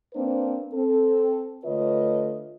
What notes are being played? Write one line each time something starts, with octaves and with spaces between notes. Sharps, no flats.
A#3 C4 D4 B4 C5
C4 A4
D3 A3 F4 B4 C#5 D#5